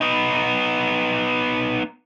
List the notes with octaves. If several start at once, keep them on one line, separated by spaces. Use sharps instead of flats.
B3 D#4